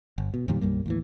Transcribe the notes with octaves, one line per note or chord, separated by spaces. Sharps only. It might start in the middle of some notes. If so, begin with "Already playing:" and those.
G1
B2
F2 A#2 D#3 G3
B1 F#2 G3 A#3
D#2 A2 E3